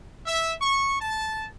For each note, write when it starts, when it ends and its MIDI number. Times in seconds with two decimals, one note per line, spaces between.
0.26 0.53 76
0.60 0.99 85
1.00 1.47 81